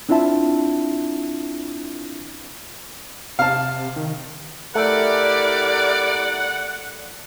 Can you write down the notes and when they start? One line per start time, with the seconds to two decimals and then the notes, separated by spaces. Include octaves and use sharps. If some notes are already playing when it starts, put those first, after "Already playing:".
0.09 C4 D4 E4 F4 E5 A5
3.39 C3 F5 A5
3.96 D#3
4.75 A3 E4 G4 A#4 D5 F#5